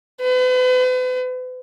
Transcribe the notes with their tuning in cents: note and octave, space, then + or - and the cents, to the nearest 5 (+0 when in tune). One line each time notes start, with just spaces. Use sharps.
B4 +40